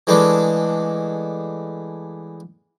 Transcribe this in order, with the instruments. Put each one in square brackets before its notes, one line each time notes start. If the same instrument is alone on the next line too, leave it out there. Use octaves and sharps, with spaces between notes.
[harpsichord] E3 G#3 A3 B3 D4